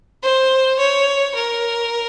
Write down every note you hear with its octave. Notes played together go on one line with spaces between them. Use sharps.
C5
C#5
A#4